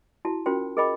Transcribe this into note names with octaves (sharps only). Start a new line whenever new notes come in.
E4 F#4 A5
C#4 F4 F#4 A#4 C5 G5
G#4 A#4 D#5 G5 B5 D6